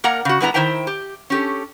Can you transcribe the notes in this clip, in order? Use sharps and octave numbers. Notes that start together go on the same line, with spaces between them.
A#3 A#4 D5 F#5 A#5
C#3 F#4
G3 G#3 B3 E4 G5 A#5
D#3 E4 C5 E5 G5 A#5
G4
C#4 G4 A4